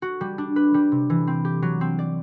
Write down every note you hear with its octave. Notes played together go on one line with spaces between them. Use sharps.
F#4
G3
D4
B4
G3
C3
E3
C4
G4
F#3
C4
D5